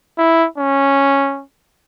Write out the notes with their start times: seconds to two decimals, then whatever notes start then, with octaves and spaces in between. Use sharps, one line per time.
0.18 E4
0.58 C#4